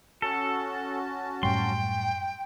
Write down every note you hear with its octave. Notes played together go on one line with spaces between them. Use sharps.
C#4 F#4 A4 A5
F#2 A2 G3 G5 C6